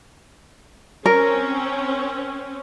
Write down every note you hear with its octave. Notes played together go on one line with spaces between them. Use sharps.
C4 C#4 A#4